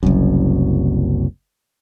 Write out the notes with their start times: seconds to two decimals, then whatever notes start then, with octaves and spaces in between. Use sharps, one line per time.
0.03 F#1 C2 F#2